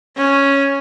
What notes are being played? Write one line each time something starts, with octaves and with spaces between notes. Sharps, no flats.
C#4